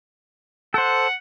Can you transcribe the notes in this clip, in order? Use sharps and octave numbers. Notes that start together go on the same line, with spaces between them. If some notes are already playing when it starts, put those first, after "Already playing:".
A4 C5 F#5